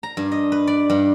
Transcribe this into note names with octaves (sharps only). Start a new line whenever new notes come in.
A#5
G2
D#5
B4
D5
G2